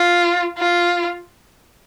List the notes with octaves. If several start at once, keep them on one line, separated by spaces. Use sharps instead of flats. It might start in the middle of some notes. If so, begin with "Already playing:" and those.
Already playing: F4
F4